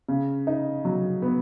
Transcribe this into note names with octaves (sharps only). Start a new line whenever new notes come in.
C#3
D#4
F#3
B3